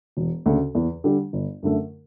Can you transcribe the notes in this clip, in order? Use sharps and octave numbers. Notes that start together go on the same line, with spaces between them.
E1
D2 C#3
E2
D3 G3 D4 G4
G1
F#2 D3 A3